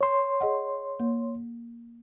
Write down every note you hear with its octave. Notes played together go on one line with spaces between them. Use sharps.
C#5 C6
G#4 D#5 F#5
A#3